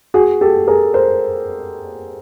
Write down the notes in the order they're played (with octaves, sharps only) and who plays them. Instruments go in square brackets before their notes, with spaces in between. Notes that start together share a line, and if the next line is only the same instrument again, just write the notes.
[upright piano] F#4 G#4
G4 A4
G#4 A#4
A#4 C5